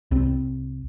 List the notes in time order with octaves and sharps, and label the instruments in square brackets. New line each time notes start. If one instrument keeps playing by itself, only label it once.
[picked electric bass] C2 C4